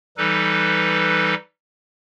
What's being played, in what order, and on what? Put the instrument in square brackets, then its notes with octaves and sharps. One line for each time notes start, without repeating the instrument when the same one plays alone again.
[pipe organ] E3 G3 D#4 A4 B4